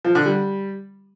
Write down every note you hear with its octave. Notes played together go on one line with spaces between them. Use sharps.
F3
D3
G3